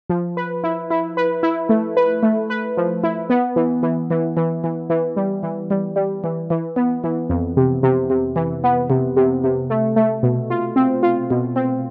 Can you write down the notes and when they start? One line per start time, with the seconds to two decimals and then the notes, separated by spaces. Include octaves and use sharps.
0.10 F3
0.37 B4
0.64 E4
0.90 E4
1.17 B4
1.43 E4
1.69 A3
1.97 B4
2.23 A3
2.50 B4
2.77 F3
3.04 E4
3.30 B3
3.56 E3
3.83 E3
4.10 E3
4.37 E3
4.64 E3
4.90 E3
5.16 G3
5.43 E3
5.70 G3
5.96 G3
6.24 E3
6.50 E3
6.76 B3
7.04 E3
7.29 F2
7.57 C3
7.83 C3
8.10 C3
8.36 E3
8.64 B3
8.90 C3
9.17 C3
9.44 C3
9.70 A3
9.96 A3
10.23 B2
10.50 F4
10.76 C4
11.03 F4
11.30 B2
11.56 C4